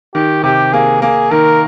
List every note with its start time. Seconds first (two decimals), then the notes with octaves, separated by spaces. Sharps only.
0.14 D#3 G4
0.44 C3 G4
0.73 A#3 G#4
1.02 A#3 G#4
1.31 D#3 A#4